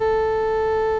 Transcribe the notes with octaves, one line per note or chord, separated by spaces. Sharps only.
A4